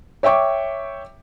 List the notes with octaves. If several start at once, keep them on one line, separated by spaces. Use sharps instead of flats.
C#5 E5 G5 C#6 D6